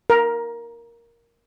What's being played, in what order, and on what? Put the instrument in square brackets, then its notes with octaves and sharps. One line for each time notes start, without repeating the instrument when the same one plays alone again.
[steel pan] A#4